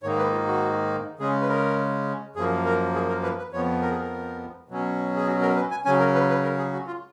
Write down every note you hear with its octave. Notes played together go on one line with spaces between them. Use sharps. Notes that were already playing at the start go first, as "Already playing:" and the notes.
G#2 D#3 A#3 D#4 C#5
B4
F4
F#4
C#3 G#3 C#4 G#4
B4
A#4
F#2 F3 A#3 G#4
A#4
G#4
A#4
B4
B4
F2 F3 B3 C#5
A#4
G#4
A#4
B2 F#3 C#4
G#4
F#4
A#4
B4
G#5
C#3 F#3 C#4 G#5
A#4
B4
B4
A#4
G#4
F#4
F4